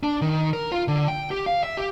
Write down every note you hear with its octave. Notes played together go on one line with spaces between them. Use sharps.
D4
D#3
A#4
F4
D3
G5
G4
F5
E5
G4